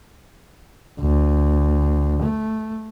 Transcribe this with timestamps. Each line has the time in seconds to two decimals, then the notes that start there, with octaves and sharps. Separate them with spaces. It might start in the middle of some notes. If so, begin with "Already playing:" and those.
1.00 D2
2.22 A3